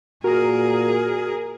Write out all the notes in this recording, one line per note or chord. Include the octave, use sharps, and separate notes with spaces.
A#2 F#4 G#4 A#4